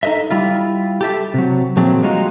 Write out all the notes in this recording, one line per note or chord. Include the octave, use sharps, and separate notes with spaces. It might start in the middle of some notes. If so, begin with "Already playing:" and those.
D#4 A4 B4 D#5 E5
G3 E4 F4
G4 A4 E5
C3 F#3
A#2 F3 F#3 A3 C4 G#4
G3 G#3 A#3 D#4 F4 F#4